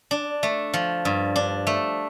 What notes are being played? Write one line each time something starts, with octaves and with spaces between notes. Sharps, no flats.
D4
A3
F3
G2
D4
A3